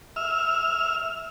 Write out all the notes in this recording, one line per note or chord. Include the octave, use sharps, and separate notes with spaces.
E5 F6